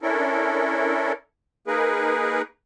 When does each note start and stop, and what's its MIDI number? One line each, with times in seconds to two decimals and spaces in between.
0.01 1.12 61
0.01 1.12 62
0.01 1.12 64
0.01 1.12 69
0.01 1.12 70
1.67 2.42 58
1.67 2.42 63
1.67 2.42 68
1.67 2.42 70
1.67 2.42 71